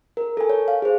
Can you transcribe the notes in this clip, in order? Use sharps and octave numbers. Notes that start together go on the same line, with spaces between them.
A#4
A4 G#5
C#5
F5
G#4 C5